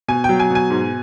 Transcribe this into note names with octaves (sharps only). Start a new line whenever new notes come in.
B2 G#5
F#3 G5
G#5
B2
G#5
G#2